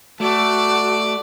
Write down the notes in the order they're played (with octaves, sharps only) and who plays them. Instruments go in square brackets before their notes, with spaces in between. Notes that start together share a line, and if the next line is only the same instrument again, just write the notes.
[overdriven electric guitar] A3 [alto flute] F#4 [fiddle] D5 A5